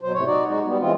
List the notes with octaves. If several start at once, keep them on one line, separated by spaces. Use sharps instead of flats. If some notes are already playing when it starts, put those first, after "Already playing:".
B2 F#3 C5
A2 C3 C#5
D#4 F#4 D5
G#3 D#4 F#4
G3 B3
E3 G#3 C4 F4